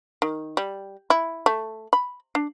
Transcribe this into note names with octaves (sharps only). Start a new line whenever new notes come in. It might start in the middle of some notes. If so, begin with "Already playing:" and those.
D#3
G3
E4
A3
B5
D4